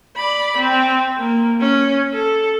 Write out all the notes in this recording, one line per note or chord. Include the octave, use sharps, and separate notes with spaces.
D5 B5
C4
A#3
C#4
A4